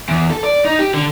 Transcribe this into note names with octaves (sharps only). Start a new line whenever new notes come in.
E2
A4
D5
D#4
G4
D3